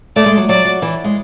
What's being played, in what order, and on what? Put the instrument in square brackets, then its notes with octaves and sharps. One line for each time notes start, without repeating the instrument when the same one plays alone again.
[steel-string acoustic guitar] A3 [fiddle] D5
[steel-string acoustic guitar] G#3
F#3
[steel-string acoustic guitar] F#3 [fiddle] D5
[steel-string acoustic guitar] F#3
E3
G#3